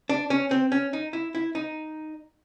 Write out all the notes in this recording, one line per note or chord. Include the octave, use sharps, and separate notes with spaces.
D4
C#4
C4
C#4
D#4
E4
E4
D#4